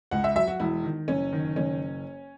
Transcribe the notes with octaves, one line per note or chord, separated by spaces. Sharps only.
C#2 F#5
E5
F#3 E5
F#4
E1 E4
D#3
F#1 C#4
D#3
F#1 C#4